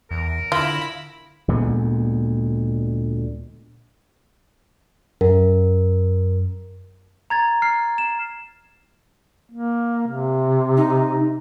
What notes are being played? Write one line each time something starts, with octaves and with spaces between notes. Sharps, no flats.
E2 A#4
D3 E4 F4 B5
D2 A#2 G#3 B3
F#2 A#4
A#5 G#6 A6
F6 C7
E7
A#3
C3
D#4